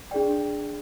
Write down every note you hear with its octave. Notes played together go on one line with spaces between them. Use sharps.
D4 G#4 D5 G5